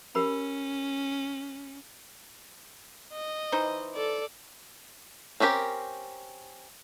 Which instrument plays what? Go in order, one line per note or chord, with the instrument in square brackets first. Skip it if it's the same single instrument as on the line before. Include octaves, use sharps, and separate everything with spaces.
[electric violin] C#4 [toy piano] G4 A#4 B5
[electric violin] D#5
[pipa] E3 D#4 C5
[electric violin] A4 D5
[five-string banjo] C4 C#4 E4 G4 A#4